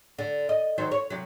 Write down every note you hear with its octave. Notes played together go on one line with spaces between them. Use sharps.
D3
D#5
D#3 F#3 C5
C#5
C3 F#3